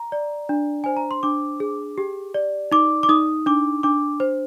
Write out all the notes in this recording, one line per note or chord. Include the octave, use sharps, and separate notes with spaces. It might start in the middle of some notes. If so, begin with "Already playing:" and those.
Already playing: A#5
D5
D4
C5 G#5
A#5
C6
D4 D6
G#4
G4
D5
D#4 D6
D6
D#4 D#6
D4 D6
D4 D6
C5